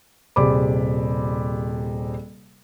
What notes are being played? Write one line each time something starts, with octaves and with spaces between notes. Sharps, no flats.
D#1 C3 G#4 D5 B5 D6